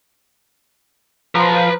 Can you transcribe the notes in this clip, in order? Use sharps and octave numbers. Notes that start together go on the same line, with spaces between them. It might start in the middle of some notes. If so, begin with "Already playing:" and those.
F3 B4 A#5